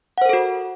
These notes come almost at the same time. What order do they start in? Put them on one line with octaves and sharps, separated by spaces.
F#5 C5 A#4 A4 F#4